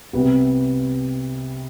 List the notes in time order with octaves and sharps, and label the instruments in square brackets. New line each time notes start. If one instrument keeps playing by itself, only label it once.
[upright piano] C2 C3 G3 B3